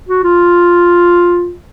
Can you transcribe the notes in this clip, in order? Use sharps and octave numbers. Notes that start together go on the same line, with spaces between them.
F#4
F4